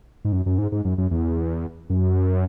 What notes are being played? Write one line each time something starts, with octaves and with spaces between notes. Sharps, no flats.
G#2
F#2
F#2
G#2
G#2
F#2
F#2
E2
F#2